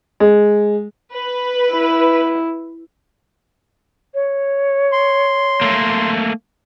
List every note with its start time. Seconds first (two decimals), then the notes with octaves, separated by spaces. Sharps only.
0.20 G#3
1.14 B4
1.72 E4
4.14 C#5
4.92 C6
5.61 A3 A#3